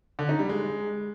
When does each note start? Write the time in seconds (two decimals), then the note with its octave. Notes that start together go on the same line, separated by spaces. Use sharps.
0.19 D3
0.29 D#4
0.39 G3
0.49 G#3